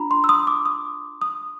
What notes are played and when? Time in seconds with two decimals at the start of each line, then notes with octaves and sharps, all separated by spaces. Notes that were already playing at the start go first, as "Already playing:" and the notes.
Already playing: D4 F4 A#5 B5
0.11 C6
0.24 E6
0.29 D#6
0.47 D6
0.66 D#6
1.22 D#6